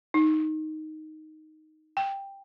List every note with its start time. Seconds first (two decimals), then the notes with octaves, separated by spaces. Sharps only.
0.14 D#4
1.97 G5